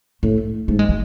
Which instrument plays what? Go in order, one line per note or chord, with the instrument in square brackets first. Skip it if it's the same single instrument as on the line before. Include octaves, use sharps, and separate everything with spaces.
[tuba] A2 [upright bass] A3
[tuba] G#2 [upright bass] A3
[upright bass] G#3
F#3